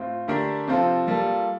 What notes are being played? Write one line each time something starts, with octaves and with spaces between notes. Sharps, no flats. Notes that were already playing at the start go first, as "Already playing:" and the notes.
Already playing: A2 C4 F4
D3 A3 D4 G4 A#4
C3 F3 C4 F4 A4
G3 A#3 F4 A4